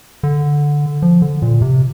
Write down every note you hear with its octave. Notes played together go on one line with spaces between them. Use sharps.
D3
F3
D3
A#2
C3